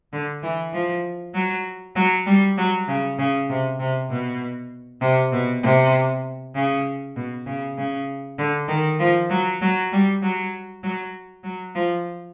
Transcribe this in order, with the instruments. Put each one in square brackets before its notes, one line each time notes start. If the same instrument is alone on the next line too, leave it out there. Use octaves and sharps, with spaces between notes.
[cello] D3
E3
F3
F#3
F#3
G3
F#3
C#3
C#3
C3
C3
B2
C3
B2
C3
C#3
B2
C#3
C#3
D3
D#3
F3
F#3
F#3
G3
F#3
F#3
F#3
F3